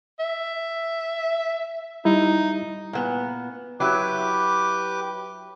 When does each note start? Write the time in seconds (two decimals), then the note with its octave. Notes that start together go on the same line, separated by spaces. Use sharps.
0.19 E5
2.05 G3 D#4 E4
2.93 A#2 B3
3.80 F#3 E4 G4 B4 D6